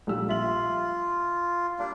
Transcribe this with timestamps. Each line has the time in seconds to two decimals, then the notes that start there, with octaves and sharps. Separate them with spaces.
0.07 A#1 G3 E6
0.29 F4 E5 F#7
1.79 G3 A#3 D4